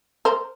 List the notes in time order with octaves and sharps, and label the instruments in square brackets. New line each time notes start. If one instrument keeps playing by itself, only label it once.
[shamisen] A#4 C5